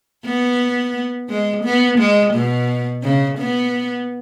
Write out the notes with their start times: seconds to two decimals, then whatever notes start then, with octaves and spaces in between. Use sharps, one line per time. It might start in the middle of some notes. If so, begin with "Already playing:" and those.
0.25 B3
1.30 G#3
1.65 B3
1.99 G#3
2.34 B2
3.03 C#3
3.39 B3